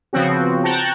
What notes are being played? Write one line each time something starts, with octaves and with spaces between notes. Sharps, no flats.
C#3 F3 B3 C4 F#4
G5 A5 A#5 C#6 F#6 G6